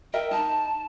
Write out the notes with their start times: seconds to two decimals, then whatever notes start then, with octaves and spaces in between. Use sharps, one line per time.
0.14 A#4 D#5 E5 G5
0.31 D#4 A5